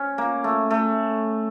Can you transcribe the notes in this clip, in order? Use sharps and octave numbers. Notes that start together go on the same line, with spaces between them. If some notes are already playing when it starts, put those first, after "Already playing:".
Already playing: C#4
A#3
A3
A3